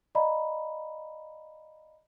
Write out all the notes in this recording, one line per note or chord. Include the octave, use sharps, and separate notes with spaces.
D5 D#5 F5 A#5 B5